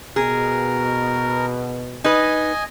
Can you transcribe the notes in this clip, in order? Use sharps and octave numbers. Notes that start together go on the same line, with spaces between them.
B2 G#4 A#4
D#4 B4 D#5 G#5